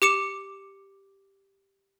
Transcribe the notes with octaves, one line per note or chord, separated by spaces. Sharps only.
G4 D6 C#7 E7